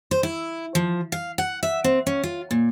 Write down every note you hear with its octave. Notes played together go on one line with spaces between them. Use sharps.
C5
E4
F3
F5
F#5
E5
C4
C#4
F4
A#2